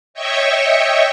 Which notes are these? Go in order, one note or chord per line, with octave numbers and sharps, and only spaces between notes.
C#5 D#5 E5 G5 C#6